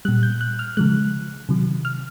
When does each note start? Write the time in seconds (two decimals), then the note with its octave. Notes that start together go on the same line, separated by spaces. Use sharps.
0.05 A#2 G3 F#6
0.23 G6
0.41 F#6
0.59 F6
0.77 C#3 F3 G#3 F#6
1.49 C3 D#3 F#3
1.85 F6